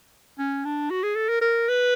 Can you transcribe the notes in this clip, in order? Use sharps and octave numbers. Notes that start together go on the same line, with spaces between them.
C#4
D4
F#4
G#4
A4
A#4
A#4
B4